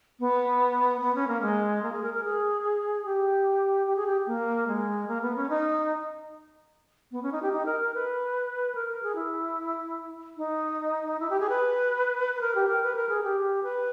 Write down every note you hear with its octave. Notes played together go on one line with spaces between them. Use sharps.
B3
B3
C#4
A#3
G#3
A#3
G#4
A#4
A#4
G#4
G4
G4
G#4
G4
A#3
G#3
A#3
B3
C#4
D#4
B3
C#4
D#4
G4
D#4
A#4
A#4
B4
A#4
A#4
G#4
E4
D#4
E4
G4
G#4
B4
B4
A#4
G4
A#4
B4
A#4
G#4
G4
B4